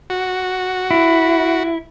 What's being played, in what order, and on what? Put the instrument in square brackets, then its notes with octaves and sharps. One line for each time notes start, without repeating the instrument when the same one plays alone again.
[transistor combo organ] F#4
[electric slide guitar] E4